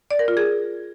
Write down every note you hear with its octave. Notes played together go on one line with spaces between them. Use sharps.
D5
A#4
F4
G#4